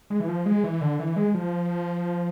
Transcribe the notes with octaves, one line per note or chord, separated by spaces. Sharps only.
G#3
E3
F3
G#3
E3
D3
E3
G#3
F3